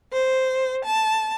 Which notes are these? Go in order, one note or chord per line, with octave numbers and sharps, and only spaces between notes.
C5
A5